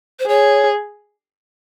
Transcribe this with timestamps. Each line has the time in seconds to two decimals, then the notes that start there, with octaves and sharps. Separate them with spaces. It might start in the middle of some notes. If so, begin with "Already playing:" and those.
0.19 C5
0.27 G#4 C#5